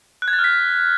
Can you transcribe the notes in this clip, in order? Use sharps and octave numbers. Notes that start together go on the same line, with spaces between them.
F#6
G#6
A6
F6
B6